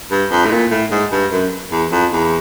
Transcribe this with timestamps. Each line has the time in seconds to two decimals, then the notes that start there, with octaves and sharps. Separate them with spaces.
0.11 G2
0.30 F2
0.46 A2
0.51 A#2
0.71 A2
0.91 G#2
1.12 G2
1.32 F#2
1.71 E2
1.91 F2
2.12 E2